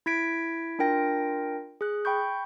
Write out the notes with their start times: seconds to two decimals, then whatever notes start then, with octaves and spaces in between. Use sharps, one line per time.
0.06 E4 G#6 B6 D7
0.79 D4 F4 A#4 G5 A#6
1.81 G#4 F#6
2.05 G5 B5 C#6 G6